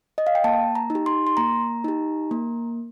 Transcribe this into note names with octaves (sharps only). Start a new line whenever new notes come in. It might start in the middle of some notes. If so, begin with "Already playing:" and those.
D#5
F5
G5
A#3 A5
A#5
D#4
G4
C6
C6
A#3 A#5
D#4 G4
A#3